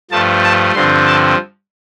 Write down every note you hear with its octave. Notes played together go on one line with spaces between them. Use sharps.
G2 F3 A3 A5
A5
G2 D3 F3 C4 C6
A5